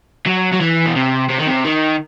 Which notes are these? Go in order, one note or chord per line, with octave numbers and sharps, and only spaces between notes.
F#3
F#3
E3
B2
C3
C3
D#3
C3
D#3